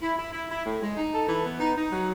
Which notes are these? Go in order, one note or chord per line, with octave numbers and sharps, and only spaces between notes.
E4
E4
E4
E4
A2
G#3
D#4
A4
E3
B3
D#4
D#4
F#3